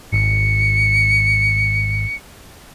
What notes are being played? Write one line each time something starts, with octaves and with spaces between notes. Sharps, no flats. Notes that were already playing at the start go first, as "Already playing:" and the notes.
G#1 C#7